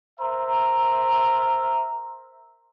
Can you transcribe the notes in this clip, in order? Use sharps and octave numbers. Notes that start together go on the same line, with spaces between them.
A#4 C5 E5 A#5